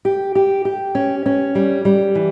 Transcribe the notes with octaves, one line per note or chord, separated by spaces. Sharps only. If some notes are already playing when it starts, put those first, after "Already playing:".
G4
G4
G4
C#4
C#4
G3
G3
E3